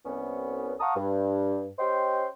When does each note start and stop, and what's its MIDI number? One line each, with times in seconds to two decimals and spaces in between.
0.06 0.75 36
0.06 0.75 59
0.06 0.75 61
0.80 0.94 77
0.80 0.94 78
0.80 0.94 81
0.80 0.94 82
0.80 0.94 85
0.80 0.94 87
0.96 1.68 43
1.79 2.27 61
1.79 2.27 67
1.79 2.27 72
1.79 2.27 75
1.79 2.27 79
1.79 2.27 84